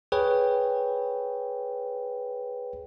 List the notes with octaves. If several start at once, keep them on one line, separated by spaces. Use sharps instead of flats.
G#4 B4 C#5 G5